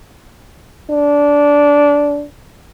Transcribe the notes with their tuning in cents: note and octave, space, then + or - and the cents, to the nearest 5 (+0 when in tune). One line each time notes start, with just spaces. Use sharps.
D4 -15